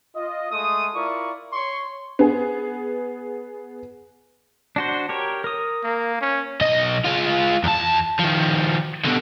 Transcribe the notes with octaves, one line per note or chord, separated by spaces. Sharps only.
F4 D#5
G#3 A3 C6 D#6
E4 F4 A#4 D5 C#6
C#5 C6 C#6
B3 G#4
D4 F#4 C5
G4 A#4 C#5
A#4 D#6
A#3
C#4
B1 D#5
G#3 F4
E2 A5
D#3 F3
B2 D3